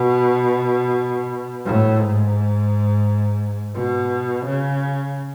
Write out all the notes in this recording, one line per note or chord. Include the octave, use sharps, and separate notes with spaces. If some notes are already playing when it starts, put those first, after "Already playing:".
Already playing: B2
A2
G#2
B2
C#3